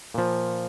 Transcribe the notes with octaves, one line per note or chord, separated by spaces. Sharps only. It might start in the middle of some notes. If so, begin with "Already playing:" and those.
A#2 F3